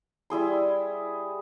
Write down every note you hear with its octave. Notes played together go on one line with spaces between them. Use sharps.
G3 E4 G#4 C6